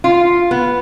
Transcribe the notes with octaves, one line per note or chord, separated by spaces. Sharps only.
F4
B3